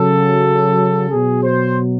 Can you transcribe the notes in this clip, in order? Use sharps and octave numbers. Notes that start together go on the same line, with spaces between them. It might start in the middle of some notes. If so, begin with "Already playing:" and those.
Already playing: C#3 F#3 A4
B2 F#3 G#4
C5